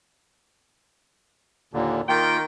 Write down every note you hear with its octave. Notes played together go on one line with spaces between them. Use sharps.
D#2 A#2 D3
D#3 A#3 F4 G5